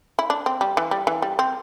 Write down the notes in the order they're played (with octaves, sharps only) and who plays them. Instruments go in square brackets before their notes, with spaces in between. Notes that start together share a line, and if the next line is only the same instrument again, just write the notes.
[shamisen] E4
D4
C4
G3
E3
G3
E3
G3
C4